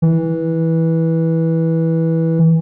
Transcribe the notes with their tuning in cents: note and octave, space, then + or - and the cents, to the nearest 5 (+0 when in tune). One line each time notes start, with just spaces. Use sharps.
E3 -15